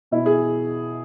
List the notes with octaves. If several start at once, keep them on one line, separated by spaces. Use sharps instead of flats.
B2 E4
G#4